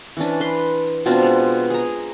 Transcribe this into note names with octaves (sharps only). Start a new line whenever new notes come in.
E3 C#4 D4
B4 C6
B2 C4 D4 F4
G#3
G#4 A#5